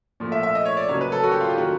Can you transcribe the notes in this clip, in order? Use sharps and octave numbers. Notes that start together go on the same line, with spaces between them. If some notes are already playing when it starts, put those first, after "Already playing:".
A#2 F3 A3
E5
E5
D#5
C#5
D5
C#3 F#3 A#3 C#5
B4
A4
F#4
G4
F4
G4
D#3 F#3 A#3 F#4